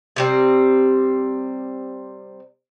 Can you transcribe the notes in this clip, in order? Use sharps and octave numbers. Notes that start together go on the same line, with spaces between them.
C3 G3 C4